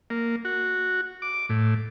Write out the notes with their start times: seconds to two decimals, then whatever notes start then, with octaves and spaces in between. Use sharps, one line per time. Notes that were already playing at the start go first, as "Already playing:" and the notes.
0.10 A#3
0.45 F#4
1.22 D6
1.49 A2